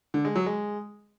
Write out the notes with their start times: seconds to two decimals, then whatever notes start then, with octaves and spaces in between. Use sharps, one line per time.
0.14 D3
0.25 G#3
0.36 F#3
0.46 G#3